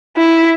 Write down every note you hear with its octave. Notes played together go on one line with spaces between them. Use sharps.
E4